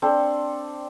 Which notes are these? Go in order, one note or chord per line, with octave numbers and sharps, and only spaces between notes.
C4 D4 A4